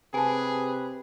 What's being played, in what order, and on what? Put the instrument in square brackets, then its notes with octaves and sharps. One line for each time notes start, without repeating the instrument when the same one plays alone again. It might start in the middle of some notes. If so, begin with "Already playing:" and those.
[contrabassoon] C3 [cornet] G#4 [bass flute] B4 [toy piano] G#5 A5